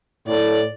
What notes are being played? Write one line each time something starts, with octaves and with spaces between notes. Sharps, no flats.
A2 D5